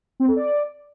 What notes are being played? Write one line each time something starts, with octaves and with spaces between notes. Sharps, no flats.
C4
A4
D5